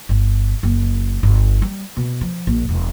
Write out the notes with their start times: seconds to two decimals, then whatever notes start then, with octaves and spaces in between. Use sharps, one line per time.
0.09 G1
0.63 F#1
1.23 G1
1.62 G3
1.97 B2
2.21 F3
2.47 A#1
2.69 E1